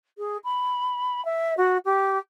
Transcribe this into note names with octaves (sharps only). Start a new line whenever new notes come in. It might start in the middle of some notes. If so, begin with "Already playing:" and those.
G#4
B5
E5
F#4
G4